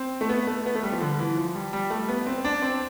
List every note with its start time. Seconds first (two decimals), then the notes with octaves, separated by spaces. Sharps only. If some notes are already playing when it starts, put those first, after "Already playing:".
Already playing: C4
0.21 A3
0.29 B3
0.47 A3
0.66 B3
0.75 A3
0.83 G3
0.92 F3
1.01 D3
1.19 E3
1.36 F3
1.55 G3
1.73 G3
1.90 A3
2.09 B3
2.26 C4
2.44 D4
2.62 C4